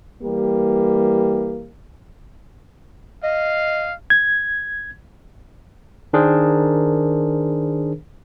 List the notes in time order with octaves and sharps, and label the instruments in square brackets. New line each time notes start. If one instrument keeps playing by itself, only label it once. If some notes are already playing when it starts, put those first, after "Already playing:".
[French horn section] E3 G3 A#3 G4
[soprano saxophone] D#5 [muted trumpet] F5
[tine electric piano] G#6
D#3 D4 G#4 A#4 C5